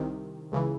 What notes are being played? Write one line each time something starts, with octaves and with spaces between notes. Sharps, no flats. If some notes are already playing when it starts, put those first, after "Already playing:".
Already playing: C2 C3 D#3
C#2 C#3 E3